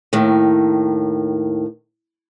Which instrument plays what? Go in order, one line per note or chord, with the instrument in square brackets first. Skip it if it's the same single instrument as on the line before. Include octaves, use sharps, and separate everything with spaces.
[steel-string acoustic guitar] D#2 A2 D#3